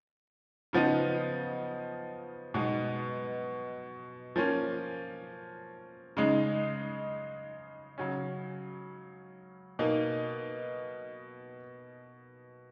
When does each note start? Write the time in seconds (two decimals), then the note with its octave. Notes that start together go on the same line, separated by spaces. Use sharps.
0.73 C#3 F3 B3 D#4
2.54 B2 G#3 B3 D#4
4.36 F3 A#3 C#4
6.17 C#3 G#3 D#4
7.98 C#3 F#3 C#4
9.79 B2 A#3 D#4